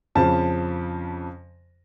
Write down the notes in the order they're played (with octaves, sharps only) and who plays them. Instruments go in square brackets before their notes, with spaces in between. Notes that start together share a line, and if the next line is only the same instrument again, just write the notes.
[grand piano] F2 C#3 F3 A5